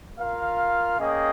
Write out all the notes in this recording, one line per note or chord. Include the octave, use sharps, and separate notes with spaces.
F4 A#4 F5
A#3 C#4 G#4 D#5 G5